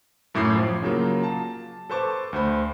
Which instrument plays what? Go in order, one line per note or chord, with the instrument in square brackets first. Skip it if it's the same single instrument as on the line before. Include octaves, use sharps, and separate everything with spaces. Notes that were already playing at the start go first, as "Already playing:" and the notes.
[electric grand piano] F#2 A2 E4 D6 G6 C7
F3
C#3 F#3 A#3 F4
A5
A4 B4 C5 A5 C#6 D6
D2 C5 B5